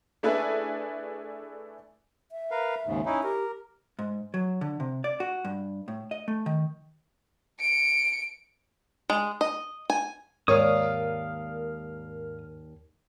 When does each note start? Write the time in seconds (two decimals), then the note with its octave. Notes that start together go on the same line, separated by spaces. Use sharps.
0.23 A3 D4 E4 G#4 A4 B4
2.32 E5
2.51 A#4 B4 F5
2.87 D#2 G#2 C#3
3.06 C#4 D#4 E4
3.23 G4 A#4
3.99 G#2
4.34 F#3
4.61 D3
4.80 C3
5.04 D5
5.20 F#4
5.45 G2
5.88 A2
6.11 D#5
6.28 A3
6.46 D#3
7.60 C#7 D7
9.10 G#3
9.41 D#5
9.90 G#5
10.48 D#2 G#2 A#4 C#5 D5 F5 D#6 F6